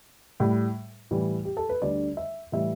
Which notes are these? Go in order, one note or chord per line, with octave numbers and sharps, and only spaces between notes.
A2 G3
A2 E3 G3
G4
A4
B4
D2 D3 G3 D5
E5
A2 E3 G3 E5